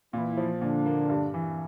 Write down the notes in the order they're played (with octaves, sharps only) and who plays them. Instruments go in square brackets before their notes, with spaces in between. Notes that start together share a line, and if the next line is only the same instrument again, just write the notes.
[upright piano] A#2 [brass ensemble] E3 E4
[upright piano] F3
[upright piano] A#2 [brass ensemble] D3 D4
[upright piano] A#3
G2
E3